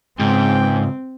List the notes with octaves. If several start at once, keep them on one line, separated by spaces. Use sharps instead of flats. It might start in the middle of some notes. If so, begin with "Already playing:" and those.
C#2 G#2 C4 G5